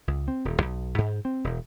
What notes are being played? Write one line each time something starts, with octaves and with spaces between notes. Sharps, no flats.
C#2
C4
D#1
B1
G#2
C4
E1